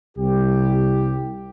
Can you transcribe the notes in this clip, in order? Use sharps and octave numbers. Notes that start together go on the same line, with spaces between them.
C2 G4